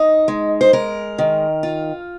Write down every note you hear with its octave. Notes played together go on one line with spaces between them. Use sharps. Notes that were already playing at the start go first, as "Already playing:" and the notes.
Already playing: D#4 D#5
G#3
C5
G#3 A#4
D#3
F4